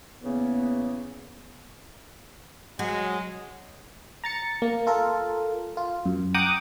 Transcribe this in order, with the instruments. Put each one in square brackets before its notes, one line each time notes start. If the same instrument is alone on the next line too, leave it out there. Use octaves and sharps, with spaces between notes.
[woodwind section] E2 C#3 A#3 B3
[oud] F#3 [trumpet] G#3
[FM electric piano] A#5 A6 C#7
A#3
F4 A4 A#4
F4
F#2
F#5 G5 A#5 D6 D#6 F#6